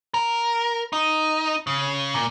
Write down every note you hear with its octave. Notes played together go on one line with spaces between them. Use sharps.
A#4
D#4
C#3
A#2